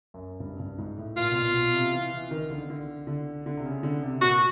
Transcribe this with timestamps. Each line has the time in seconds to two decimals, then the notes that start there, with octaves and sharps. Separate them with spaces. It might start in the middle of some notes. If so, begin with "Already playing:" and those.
0.14 F#2
0.40 G2
0.60 G2
0.78 G#2
0.97 A2
1.17 A#2 F4
1.31 B2
1.35 A#2
1.54 B2
1.73 C3
1.93 E3
2.12 E3
2.31 D#3
2.50 D3
2.70 D3
3.07 D3
3.46 D3
3.57 C3
3.65 C#3
3.83 D3
4.02 C3
4.21 A#2 F#4